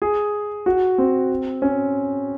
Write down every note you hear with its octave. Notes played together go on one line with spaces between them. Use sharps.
G#4
F#4
C4
C#4